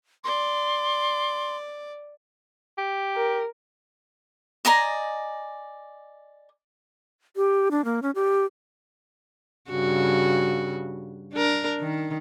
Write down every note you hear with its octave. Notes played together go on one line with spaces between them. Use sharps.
D5 C6
G4
A#4
D5 D#5 G#5 A#5
G4
D4
A#3
C#4
G4
G2 C#3 F#4
D4 A#4
D#3